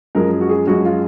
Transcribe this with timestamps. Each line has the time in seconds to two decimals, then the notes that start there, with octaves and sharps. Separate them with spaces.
0.15 F#2 F3 G#3 A#4
0.41 F#4
0.49 G#4
0.67 F#2 F3 G#3 F#4
0.85 F4